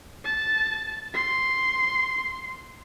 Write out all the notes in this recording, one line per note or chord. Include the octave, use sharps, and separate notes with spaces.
A5
C6